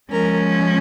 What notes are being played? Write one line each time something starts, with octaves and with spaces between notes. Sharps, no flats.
F3 G#3 C#4 A#4